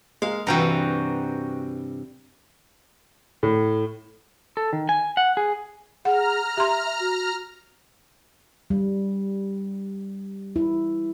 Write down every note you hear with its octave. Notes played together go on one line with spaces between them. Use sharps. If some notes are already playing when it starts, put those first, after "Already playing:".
G#3 A#3 F5
G2 C3 E3 F#4 G5 A#5
A2
A4
D#3
G#5
F#5
G#4
G#4 F#5 A#5 F6
G4 E5 C6
F#4
G3
E4